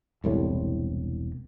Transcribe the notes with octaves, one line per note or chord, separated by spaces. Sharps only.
E1 C2 A2